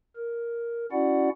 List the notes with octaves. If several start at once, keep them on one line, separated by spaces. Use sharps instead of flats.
A#4
C#4 E4 F#4 D5 F#5